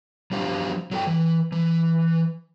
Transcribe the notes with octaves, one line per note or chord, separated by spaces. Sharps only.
F3 F#3 D4 G4 C5 F5
F#3 A4 G5
E3
E3